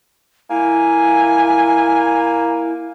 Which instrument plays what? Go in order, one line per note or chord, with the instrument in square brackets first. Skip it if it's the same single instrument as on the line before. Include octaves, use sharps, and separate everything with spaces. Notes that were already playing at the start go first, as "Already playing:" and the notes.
[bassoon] A#3 [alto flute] E4 [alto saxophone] G#5